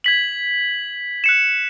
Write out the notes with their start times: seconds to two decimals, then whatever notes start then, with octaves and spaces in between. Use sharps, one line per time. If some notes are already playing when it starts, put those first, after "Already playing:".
0.04 G#6 B6 F#7
1.24 F#6 C#7 E7